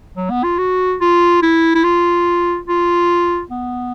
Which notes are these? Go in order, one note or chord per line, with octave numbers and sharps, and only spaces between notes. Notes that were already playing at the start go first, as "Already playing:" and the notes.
F#3
B3
F4
F#4
F4
E4
E4
F4
F4
B3